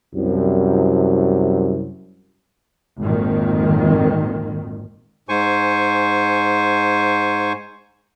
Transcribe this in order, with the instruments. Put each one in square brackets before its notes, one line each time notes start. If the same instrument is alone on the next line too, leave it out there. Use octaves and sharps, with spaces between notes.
[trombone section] C2 F#2
[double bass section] G#1 F2 A#2 D#3
[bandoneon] G#2 C5 G#5 C#6